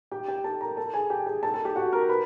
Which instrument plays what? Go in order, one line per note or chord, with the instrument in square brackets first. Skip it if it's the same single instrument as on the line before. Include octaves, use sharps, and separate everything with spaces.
[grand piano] G4 G5
G4 G5
A4 A5
A#4 A#5
A4 A5
G#4 G#5
G4 G5
G#4 G#5
A4 A5
A4 A5
G4 G5
F#4 F#5
A#4 A#5
B4 B5